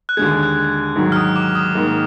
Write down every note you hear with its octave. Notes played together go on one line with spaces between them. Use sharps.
F#6
D#2 D3 G#3 G#6
F#6
G#2 D#3 F#3
F6
D#6
D6
D#6
G#2 D#3 A#3